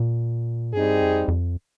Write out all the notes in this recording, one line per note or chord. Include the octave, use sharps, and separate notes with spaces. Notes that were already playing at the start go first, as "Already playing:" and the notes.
Already playing: A#2
G2 G3 C4 D#4 G#4
F2
F2